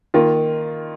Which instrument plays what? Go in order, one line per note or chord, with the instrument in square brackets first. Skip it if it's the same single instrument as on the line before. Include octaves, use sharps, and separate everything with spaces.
[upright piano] D#3 A#3 F4